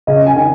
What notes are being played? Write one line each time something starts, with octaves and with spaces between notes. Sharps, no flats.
C#3 D#5
G#5
D#3